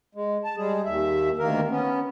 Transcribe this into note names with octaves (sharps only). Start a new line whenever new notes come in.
G#3
A5
G3 G#3 G#4
D#2 E5
D2 D#3 A#3 A#4
B3 C#4